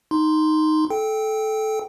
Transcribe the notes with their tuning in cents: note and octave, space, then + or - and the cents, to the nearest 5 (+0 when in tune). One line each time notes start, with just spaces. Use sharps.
D#4 +0 C6 -5
A4 -20 G5 +0